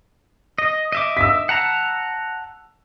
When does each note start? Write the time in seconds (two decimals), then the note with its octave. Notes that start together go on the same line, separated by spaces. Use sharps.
0.58 D#5
0.92 D#5 E5 D6
1.17 E6 B6
1.49 F#5 A5 A#5